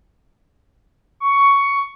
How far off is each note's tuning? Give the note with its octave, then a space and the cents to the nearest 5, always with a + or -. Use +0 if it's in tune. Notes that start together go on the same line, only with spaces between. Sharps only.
C#6 +10